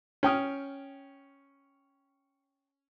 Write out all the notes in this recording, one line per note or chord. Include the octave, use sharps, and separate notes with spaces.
C#4 G5 D#6 F6